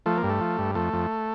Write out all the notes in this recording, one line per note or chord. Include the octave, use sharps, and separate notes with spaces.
F3 A3
A#3
G2
A3
F3
G2
F2 A3
F2